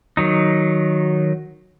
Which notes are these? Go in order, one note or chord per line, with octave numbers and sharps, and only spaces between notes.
D#3 F#3 D#4